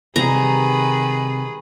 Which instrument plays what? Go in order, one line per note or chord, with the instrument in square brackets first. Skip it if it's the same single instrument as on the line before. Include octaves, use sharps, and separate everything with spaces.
[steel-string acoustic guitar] C3 G3 [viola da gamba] D#3 G#4 B4 [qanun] A#5